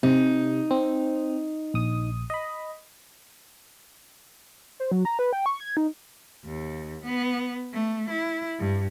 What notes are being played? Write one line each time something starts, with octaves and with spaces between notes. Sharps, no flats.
C3 D#4
C4
A#1 D#6
D#5 B5
C5
F#3
A#5
B4
G5
C#6
G#6
D#4
D#2
B3
A3
E4
G2